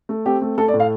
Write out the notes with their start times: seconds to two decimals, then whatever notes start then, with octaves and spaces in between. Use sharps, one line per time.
0.09 A3
0.26 C4 G4
0.42 A3
0.58 A3 A4
0.68 D5
0.74 A2
0.80 F5